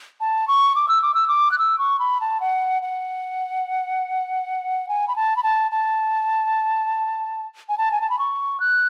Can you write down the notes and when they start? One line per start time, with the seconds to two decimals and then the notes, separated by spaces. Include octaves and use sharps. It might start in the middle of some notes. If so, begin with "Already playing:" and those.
0.21 A5
0.48 C#6
0.76 D6
0.88 E6
1.02 D6
1.14 E6
1.28 D6
1.52 F#6
1.59 E6
1.78 C#6
1.99 B5
2.21 A5
2.40 F#5
2.82 F#5
4.89 G#5
5.08 B5
5.16 A5
5.37 B5
5.43 A5
5.71 A5
7.69 G#5
7.78 A5
7.92 G#5
8.01 A5
8.10 B5
8.19 C#6
8.60 F#6